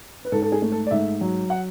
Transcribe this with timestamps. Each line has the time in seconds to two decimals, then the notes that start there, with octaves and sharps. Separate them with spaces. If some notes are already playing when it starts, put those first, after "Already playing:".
0.25 B4
0.32 G#2 A4
0.42 A4
0.52 G#4
0.62 A3
0.72 A4
0.87 D5
0.91 G#2 E5
1.21 F#3
1.50 F#5